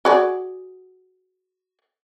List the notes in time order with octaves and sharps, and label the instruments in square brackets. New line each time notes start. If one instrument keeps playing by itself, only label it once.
[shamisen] F#4 G#4 D5